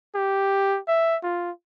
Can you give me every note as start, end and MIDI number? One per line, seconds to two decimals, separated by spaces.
0.15 0.79 67
0.88 1.17 76
1.23 1.51 65